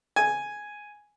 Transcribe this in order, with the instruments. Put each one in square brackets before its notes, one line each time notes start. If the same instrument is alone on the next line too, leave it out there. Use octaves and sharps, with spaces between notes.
[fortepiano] G#5